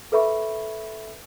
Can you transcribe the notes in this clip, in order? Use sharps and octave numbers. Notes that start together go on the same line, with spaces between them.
A4 B4 E5 B5 C#6